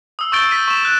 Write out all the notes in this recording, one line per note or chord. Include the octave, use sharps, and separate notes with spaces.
D#6 E6
C#6 E6 G6 A6 D7 G7
G6 B6 D#7
C#6 E7
F#6